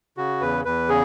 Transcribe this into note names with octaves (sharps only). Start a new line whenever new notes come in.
C#3 F#4
E2 B4
E2 B4
C#3 G#4